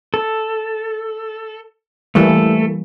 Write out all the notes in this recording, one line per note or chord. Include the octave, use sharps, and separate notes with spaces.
A4
E3 G3 A3 A#3 A4